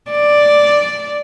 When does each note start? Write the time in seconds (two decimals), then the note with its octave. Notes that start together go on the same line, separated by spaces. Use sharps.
0.11 D5